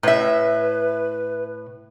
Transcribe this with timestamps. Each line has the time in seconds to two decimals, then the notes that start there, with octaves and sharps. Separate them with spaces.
0.03 A2 B4 E5